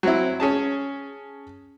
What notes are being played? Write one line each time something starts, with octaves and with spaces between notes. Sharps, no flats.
F#3 C4 E4
C#4 G#4 A5